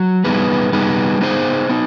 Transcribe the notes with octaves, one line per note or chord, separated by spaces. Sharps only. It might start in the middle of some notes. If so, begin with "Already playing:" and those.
Already playing: F#3
G3 B3 D#4 G#4 B4
G3 B3 D#4 G#4 B4
B3 D#4 G#4 C5
B3 D#4